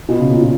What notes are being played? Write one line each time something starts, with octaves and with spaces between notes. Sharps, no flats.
B2
C#3
A#2
B2